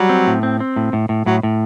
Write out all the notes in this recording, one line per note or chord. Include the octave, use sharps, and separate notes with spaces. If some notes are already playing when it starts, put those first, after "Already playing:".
Already playing: F#3 G3
C4
A2
C4
C4
A2
A2
A2
A2 F#3
A2